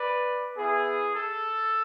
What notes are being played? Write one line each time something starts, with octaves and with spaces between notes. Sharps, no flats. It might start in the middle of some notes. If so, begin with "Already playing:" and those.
Already playing: B4 D5
B3 E4 G#4
A4